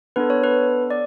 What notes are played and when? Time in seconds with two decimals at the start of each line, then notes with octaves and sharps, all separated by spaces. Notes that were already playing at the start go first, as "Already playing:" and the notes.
0.16 B3 D4 A4 B4
0.30 C#5
0.44 B4
0.90 D5